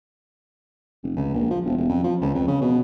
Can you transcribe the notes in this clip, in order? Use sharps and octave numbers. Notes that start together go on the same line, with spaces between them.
F1
C#2
A#1
F3
E1
E1
F2
F3
C#2
F2
C#3
B2